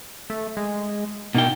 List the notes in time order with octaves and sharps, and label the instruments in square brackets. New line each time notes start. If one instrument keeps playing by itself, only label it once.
[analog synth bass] A3
G#3
[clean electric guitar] B2 D#4 G5 [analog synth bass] A#3